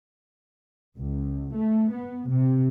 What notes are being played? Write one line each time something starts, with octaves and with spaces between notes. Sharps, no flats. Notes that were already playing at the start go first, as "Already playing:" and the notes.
C#2
A3
B3
C3